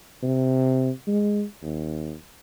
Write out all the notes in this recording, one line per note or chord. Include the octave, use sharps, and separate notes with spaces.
C3
G#3
D#2